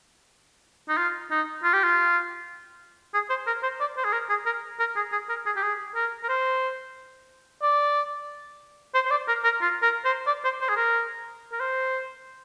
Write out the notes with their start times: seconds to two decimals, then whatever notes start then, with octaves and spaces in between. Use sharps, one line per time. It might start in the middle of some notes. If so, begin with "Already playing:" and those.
0.89 D#4
0.97 F4
1.31 D#4
1.63 F4
1.73 G4
1.83 F4
3.14 G#4
3.30 C5
3.47 A#4
3.63 C5
3.80 D5
3.97 C5
4.04 G#4
4.13 A#4
4.29 G#4
4.46 A#4
4.79 A#4
4.96 G#4
5.12 G#4
5.29 A#4
5.46 G#4
5.56 G4
5.62 G#4
5.95 A#4
6.24 A#4
6.29 C5
7.62 D5
8.94 C5
9.05 C5
9.11 D5
9.28 A#4
9.44 A#4
9.61 F4
9.82 A#4
10.05 C5
10.26 D5
10.44 C5
10.61 C5
10.69 G#4
10.76 A#4
11.52 A#4
11.60 C5